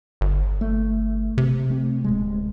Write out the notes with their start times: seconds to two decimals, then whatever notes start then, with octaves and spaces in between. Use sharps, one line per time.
0.21 G1
0.61 A3
1.38 C3
1.70 A3 C4
2.04 D1 G#3